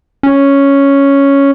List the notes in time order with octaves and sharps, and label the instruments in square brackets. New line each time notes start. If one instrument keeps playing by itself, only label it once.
[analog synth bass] C#4